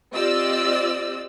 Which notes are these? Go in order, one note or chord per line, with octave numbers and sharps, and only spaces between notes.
C4 F4 G4 D5 D#5 E6